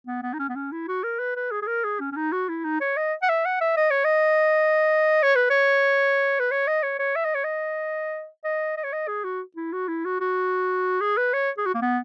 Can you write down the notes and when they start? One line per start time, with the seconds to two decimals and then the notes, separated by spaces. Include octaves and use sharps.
0.07 B3
0.22 B3
0.34 D#4
0.39 C#4
0.49 B3
0.56 C#4
0.72 E4
0.88 F#4
1.04 A#4
1.19 B4
1.36 B4
1.51 G#4
1.62 G#4
1.67 A#4
1.84 G#4
2.00 C#4
2.12 C#4
2.16 D#4
2.32 F#4
2.49 E4
2.64 D#4
2.81 C#5
2.97 D#5
3.22 F#5
3.29 E5
3.46 F#5
3.61 E5
3.77 D#5
3.90 C#5
4.04 D#5
5.22 C#5
5.35 B4
5.50 C#5
6.39 B4
6.51 C#5
6.67 D#5
6.83 C#5
6.99 C#5
7.16 E5
7.25 D#5
7.35 C#5
7.44 D#5
8.44 D#5
8.77 D#5
8.84 C#5
8.92 D#5
9.08 G#4
9.24 F#4
9.56 E4
9.73 F#4
9.88 E4
10.05 F#4
10.20 F#4
11.01 G#4
11.17 B4
11.33 C#5
11.58 G#4
11.66 F#4
11.74 A#3
11.82 B3